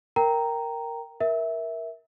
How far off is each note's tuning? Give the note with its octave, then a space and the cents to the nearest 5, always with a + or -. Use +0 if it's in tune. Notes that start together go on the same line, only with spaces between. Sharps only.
A#4 +0 G5 +0 A#5 -5
A#4 +15 E5 -10